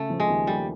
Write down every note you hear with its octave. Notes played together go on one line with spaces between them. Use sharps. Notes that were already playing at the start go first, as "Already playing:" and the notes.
Already playing: C#3 A3
F3
G#3
D#2
G3 A3